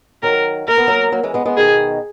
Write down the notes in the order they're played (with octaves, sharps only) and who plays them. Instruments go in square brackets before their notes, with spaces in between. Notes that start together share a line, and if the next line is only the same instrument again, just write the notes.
[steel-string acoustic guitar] D#3 F#3 [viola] A#4
[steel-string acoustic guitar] A#3 [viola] A#4
[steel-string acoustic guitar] B3
F#3 A#3
F#3 A#3
E3 G#3
G#3 B3
G#3 B3
[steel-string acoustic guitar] B2 D#3 [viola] G#4